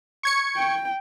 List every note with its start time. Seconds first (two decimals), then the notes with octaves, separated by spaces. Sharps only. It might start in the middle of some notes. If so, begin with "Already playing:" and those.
0.23 C#6 G#6 C#7
0.56 G5